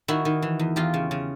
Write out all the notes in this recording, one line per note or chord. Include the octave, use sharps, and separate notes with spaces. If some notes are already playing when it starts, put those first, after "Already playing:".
D#3 E4 F#4
D#3
E3
E2
E2 F4 G4
C#3
C#3